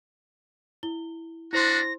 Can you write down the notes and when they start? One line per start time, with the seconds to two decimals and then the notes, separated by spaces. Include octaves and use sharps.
0.83 E4 G7
1.53 G3 D4 E4 F#4 C5 C6 A#6